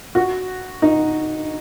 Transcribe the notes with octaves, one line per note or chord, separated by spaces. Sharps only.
F#4
D#4